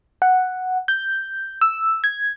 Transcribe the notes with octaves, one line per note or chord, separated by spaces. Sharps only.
F#5
G6
E6
G#6